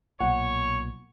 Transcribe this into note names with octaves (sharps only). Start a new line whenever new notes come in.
B1 A#2 C#5 F#5